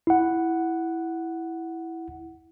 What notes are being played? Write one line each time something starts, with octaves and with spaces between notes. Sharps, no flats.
E4 F#5